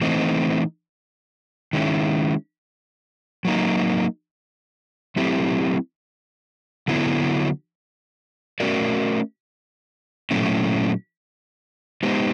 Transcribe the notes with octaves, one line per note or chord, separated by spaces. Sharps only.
E3 A3 C4 D#4
D#3 G#3 C#4 E4
F#3 A#3 D#4
F#3 A3 C4 E4 G4
D3 F#3 B3 E4
A3 C#4 F#4 A#4 D5
A#2 F#3 A3 C#4 E4
G#3 B3 D#4 G4 C5